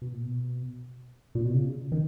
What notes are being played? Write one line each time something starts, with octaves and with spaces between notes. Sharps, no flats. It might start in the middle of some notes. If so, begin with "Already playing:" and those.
B2
A#2
B2
A#2
B2
C#3
D#3